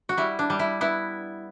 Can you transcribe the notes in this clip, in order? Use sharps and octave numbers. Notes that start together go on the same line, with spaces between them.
F#4
G3 E4
D4
G3
E4
B3 E4